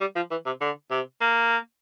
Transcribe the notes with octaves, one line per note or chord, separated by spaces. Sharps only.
G3
F3
E3
C3
D3
C3
A#3